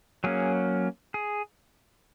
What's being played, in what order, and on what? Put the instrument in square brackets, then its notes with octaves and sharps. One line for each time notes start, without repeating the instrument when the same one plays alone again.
[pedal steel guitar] F#3 A#3 C#4 G#4
G#4